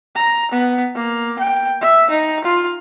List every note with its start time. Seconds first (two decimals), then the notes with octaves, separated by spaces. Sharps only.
0.16 A#5
0.51 B3
0.95 A#3
1.39 G5
1.81 E5
2.10 D#4
2.44 F4